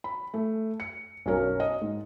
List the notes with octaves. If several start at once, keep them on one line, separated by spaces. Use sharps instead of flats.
B5
A3
C#7
B1 F#2 F#3 C#4 A#4
D#5
G#2